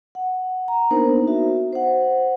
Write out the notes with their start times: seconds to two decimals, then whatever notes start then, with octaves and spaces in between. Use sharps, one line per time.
0.15 F#5
0.68 A#5
0.91 A#3 B3 D4 D#4 A#4 C5
1.27 F#4 E5
1.73 C5 F#5